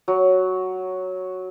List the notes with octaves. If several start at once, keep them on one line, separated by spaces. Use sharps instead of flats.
F#3